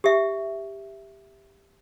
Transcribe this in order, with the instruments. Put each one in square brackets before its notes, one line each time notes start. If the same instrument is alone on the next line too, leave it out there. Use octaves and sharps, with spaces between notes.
[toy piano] G4 E5